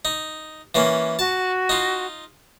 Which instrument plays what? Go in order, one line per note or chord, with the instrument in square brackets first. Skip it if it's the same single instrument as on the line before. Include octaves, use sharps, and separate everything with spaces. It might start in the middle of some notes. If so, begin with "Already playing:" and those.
[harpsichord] D#4
E3 A#3 C#4
[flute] F#4 [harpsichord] A5
[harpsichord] D#4 F4